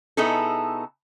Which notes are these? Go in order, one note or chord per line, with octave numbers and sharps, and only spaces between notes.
B2 B3 D#4 E4 G#4 A4